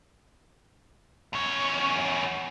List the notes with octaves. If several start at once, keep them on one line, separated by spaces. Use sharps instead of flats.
E2 C#5